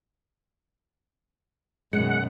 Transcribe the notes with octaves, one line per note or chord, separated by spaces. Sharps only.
F#2 B2 D#3 G#3 F#5